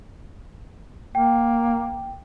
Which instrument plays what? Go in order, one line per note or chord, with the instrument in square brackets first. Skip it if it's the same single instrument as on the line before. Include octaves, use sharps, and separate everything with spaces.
[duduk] A#3 [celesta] G5